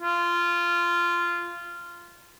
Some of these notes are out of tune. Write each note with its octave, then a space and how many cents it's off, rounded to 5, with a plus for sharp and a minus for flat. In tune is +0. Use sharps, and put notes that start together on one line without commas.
F4 -15